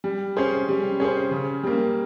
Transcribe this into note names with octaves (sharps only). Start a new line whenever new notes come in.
G3
C#4 G#4 C5
G3
C#4 G#4 C5
C#3
G3 A#3